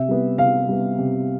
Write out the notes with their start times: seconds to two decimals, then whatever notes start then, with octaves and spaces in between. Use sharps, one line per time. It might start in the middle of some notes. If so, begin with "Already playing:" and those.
Already playing: C3 E5
0.08 G3 B3
0.38 C3 F5
0.68 G3 B3
0.98 C3